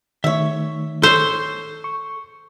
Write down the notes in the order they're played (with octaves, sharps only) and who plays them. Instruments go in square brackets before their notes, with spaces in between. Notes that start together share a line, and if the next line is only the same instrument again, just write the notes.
[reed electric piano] D#3 A3 [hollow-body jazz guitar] C#5 E5
[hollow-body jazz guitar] A4 C#5 [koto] C5
[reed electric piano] C#6